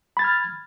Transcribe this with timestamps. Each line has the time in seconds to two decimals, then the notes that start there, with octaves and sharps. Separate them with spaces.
0.17 B5
0.19 A6
0.22 G#6
0.24 F6